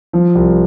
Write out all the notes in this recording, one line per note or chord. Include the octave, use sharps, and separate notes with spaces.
F3
C2